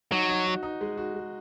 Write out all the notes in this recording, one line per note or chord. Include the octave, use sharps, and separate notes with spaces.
F#3 D#4
D#4
F#4
D#4
G#3
F#4
G#3